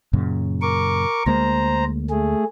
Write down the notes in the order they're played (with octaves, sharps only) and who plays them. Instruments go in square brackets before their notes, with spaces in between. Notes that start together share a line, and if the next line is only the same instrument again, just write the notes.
[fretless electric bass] F#2 A#2 C#3
[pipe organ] A#4 C#6 D6
[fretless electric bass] D2 G#3 A#3 [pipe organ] C5 A#5
[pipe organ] A3 G#4